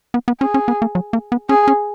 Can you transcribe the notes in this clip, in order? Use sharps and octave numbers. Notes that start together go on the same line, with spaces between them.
B3
B3
C#4 G#4
C#4
B3
A#3
F#3
A#3
B3
C#4 G#4
C#4